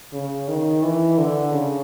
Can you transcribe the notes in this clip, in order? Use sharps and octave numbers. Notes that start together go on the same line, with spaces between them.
C#3
D#3
E3
D3
C#3